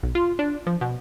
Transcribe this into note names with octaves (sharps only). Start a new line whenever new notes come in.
B1
F4
D4
F3
B2